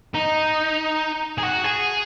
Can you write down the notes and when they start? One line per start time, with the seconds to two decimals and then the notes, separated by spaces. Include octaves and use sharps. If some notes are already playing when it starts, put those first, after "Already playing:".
0.14 D#4
1.38 G#4
1.43 F#4
1.64 G#4